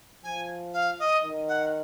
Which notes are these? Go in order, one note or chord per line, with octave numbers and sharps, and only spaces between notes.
F3 G#5
F5
D#5
D#3
F#5